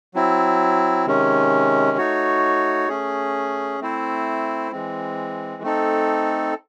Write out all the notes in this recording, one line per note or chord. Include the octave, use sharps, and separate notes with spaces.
F#3 C4 E4
C3 D#3 G#3 C#4
A3 D#4 F#4 C#5
A3 C#4 G#4
A3 C4 E4 C5
E3 G#3 C4
A3 C4 D#4 A4